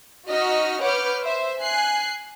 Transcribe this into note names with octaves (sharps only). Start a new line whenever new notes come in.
D#4 F#4 D#5 F6 B6
B4 C#5 F#5 D6 F6 G6
C5 E5
G#5 F#6 C7